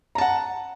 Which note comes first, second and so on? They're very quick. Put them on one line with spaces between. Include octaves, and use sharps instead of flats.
A#5 A5 F#5